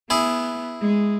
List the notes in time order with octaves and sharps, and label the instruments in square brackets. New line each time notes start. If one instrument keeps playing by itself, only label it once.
[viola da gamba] B3 [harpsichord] E4 G#4
[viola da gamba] G#3